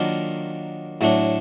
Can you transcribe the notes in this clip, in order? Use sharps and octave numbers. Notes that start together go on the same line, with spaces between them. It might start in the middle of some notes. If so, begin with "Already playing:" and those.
Already playing: D#3 F#3 A#3 D4 F4
A2 F#3 A3 D4